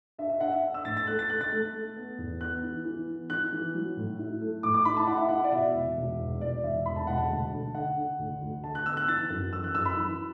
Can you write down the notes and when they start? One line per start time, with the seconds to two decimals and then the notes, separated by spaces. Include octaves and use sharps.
0.18 D4 E5
0.30 E5
0.40 D4 F#5
0.52 E5
0.63 D4
0.74 E6
0.85 A2 A6
0.97 A6
1.07 A3 F#6
1.19 A6
1.30 A3 F#6
1.41 A6
1.52 A3
1.74 A3
1.96 B3
2.18 E2
2.41 B3 F#6
2.63 E3
2.85 E3
3.07 B3
3.30 E3 F#6
3.53 E3
3.74 F#3
3.97 A2
4.19 E4
4.41 A3
4.63 A2 D6
4.74 D6
4.85 E4 B5
4.97 A5
5.07 E4 F#5
5.18 E5
5.29 E4 F#5
5.44 D5
5.52 B2 E5
5.74 E1
5.97 E1
6.19 E2
6.41 E1 D5
6.63 E1 E5
6.86 E2 B5
6.96 A5
7.07 E1 F#5
7.18 A5
7.30 D2
7.52 D3
7.75 D3 F#5
7.97 D3
8.19 D2
8.41 D2
8.64 D3 A5
8.75 F#6
8.86 B3 E6
8.97 F#6
9.08 E3 A6
9.30 F#2
9.52 E3 E6
9.64 F#6
9.75 F#2 E6
9.86 B5
9.97 E3